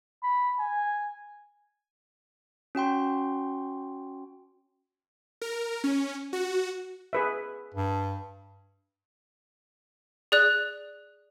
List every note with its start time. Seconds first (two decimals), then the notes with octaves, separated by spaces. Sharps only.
0.23 B5
0.60 G#5
2.75 C#4 F#4 G5 C6
5.42 A#4
5.84 C#4
6.33 F#4
7.13 G#4 B4 E5
7.74 G2
10.32 G#4 D5 F#6